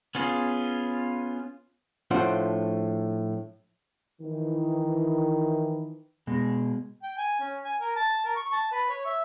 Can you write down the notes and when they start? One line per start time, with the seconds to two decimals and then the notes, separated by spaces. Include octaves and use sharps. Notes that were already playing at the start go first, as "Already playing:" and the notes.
0.15 B3 C#4 F4 G#4
2.11 A2 F3 D4 F4 C5 F#5
4.21 D#3 E3
6.27 B2 G#3
7.03 G5
7.18 G#5
7.40 C#4
7.65 G#5
7.81 A#4
7.96 A5
8.25 A#4
8.36 C#6
8.52 A5
8.72 B4
8.89 C#5
9.05 E5